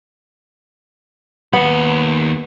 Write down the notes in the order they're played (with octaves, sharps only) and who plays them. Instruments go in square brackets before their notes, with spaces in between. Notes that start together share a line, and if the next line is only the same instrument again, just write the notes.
[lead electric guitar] D#2 B5 [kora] B3